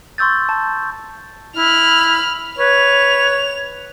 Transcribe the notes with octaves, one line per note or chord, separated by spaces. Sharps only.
C6 C#6 E6 G6 A6
A5
E4 B5 F6
B4 C#5 F7